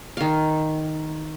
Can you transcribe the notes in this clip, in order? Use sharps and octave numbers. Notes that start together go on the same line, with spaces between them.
D#3 F5